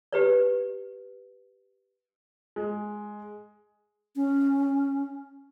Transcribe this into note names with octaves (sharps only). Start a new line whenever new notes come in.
G4 B4 D5
G#3
C#4